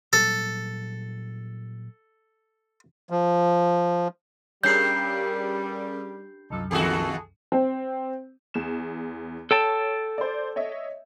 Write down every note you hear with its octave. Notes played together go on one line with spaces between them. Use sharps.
A#2 F#3 G3 A4
F3
G2 G3 C#4 G#4 A#4 G6 C7
C2 F#2 F3 D#4 A4
E2 A#2 D#3 F#4 G#4 A4
C4
E2 E7
A4 C#5 G5 A5
C5 D5
C#5 D#5 E5